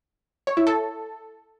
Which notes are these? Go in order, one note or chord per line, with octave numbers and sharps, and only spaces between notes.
C#5
E4
A4